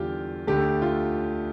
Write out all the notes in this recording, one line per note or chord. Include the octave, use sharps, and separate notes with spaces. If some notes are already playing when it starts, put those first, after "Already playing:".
Already playing: E2 D3 G3 F4 G4
D2 D3 A3 G4
F4